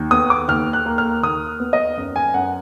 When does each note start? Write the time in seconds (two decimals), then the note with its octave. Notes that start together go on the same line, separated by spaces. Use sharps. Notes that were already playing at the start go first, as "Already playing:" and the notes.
Already playing: D#2
0.11 B3 D#6
0.30 D6
0.48 D#2 F6
0.73 F#6
0.86 A#3
0.98 F6
1.23 D#2 D#6
1.60 B3
1.73 D#5
1.97 F#2
2.16 G#5
2.34 F#2 F#5